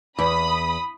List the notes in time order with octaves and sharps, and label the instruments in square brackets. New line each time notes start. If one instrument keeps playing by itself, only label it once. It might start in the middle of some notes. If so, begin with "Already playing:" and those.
[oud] E2 [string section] B5 D#6